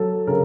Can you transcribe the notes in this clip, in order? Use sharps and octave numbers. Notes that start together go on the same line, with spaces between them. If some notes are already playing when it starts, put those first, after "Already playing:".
Already playing: F#3 A4
C#3 A#4